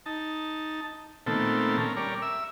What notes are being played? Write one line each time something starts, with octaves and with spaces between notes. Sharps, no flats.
D#4 A5
A#2 D#3 A3 B3 C4 A4
C#4 A#4
G3 A#4 C#5 D5
E5 E6